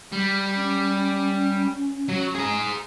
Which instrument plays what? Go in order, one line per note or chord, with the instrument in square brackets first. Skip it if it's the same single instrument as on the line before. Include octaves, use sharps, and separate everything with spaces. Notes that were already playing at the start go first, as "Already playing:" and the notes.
[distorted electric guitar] G3
[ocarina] C#4
[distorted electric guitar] F#3
G#4 A#5